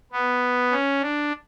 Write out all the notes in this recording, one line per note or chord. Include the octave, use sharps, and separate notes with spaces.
B3
C#4
D4